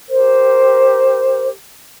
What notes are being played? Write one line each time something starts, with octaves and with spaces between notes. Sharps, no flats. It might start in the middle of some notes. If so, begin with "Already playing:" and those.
G4 A#4 C5